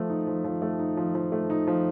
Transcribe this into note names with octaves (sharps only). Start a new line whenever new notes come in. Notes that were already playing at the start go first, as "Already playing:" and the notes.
Already playing: F3 A3
D#4
F3
F3
A3
D#4
F3
F3
A3
D#4
F3